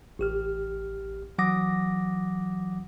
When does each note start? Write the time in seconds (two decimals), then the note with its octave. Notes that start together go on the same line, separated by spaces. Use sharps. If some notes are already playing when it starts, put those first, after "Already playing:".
0.19 A1 G4 F6
1.38 E3 F#3 F#5 D6 D#6 A#6